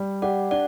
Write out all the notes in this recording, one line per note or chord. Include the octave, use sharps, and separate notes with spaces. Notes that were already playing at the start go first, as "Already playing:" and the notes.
Already playing: G3
G4 D5 F#5
D4 D5 F#5